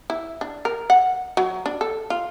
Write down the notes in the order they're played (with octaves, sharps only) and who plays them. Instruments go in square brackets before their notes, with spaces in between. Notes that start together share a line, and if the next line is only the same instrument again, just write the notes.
[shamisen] E4
D4
A#4
F#5
F#3
D4
A4
F4